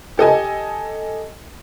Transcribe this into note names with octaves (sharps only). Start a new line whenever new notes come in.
G4 A4 D#5 G#5